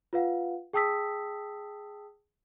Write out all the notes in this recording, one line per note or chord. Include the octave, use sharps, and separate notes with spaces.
F4 B4 F5 F#5
G#4 G5 A5 D#6 E6 B6